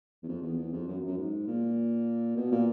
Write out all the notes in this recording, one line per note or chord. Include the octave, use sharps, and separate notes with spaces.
E2
F2
E2
E2
F2
F#2
F#2
G#2
A#2
B2
A#2